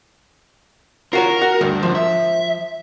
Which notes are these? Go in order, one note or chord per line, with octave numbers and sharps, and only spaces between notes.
F4 F#4 A#4 C#5
F#4
D2 G2
F2 G#2 F3
E5